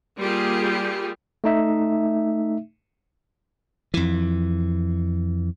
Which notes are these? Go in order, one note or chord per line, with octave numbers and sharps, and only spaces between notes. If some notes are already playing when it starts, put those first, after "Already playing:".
G3 A#3 F4 G4 G#4
A3 D#4 E5
F2 E3